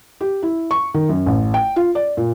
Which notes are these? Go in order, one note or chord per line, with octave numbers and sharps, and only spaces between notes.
G4
E4
C#6
D#3
F#2
A1
G5
F4
D5
A#2